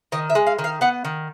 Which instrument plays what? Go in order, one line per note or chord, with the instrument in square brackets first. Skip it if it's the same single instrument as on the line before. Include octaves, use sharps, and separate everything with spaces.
[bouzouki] D#3 D#5
E5
G#3
F5
D#3
F5
B3 F#5
D#3